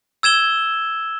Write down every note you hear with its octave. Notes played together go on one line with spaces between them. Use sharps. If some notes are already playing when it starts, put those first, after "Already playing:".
E6 G#6 E7 G7